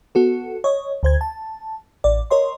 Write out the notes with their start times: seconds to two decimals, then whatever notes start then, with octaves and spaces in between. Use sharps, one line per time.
0.15 B3 F#4 A4
0.64 C#5 D#5
1.03 D2 C5 G#6
1.21 A5
2.04 A1 D5
2.30 A#4 C#5 D#5 C6